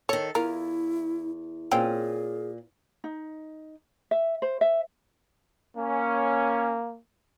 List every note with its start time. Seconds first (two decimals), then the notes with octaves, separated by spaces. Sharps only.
0.09 D#3 A4 C#5
0.35 E2 E4 F4 A#4
1.71 A#2 C4 C#4 G#4 G5
3.04 D#4
4.11 E5
4.42 C5
4.61 E5
5.77 A#3 C#4